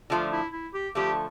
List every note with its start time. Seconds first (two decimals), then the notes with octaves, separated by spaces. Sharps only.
0.10 D3 F3 A3 F4
0.32 E4
0.53 E4
0.74 G4
0.95 D3 F3 A3 G4